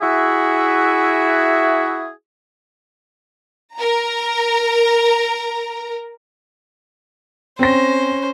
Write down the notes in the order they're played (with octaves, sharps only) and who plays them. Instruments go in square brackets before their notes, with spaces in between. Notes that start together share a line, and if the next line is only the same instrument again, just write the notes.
[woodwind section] E4 F#4 G#4 E5
[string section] A#4 A#5
[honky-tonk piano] C4 A#6 [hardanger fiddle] C#4 C5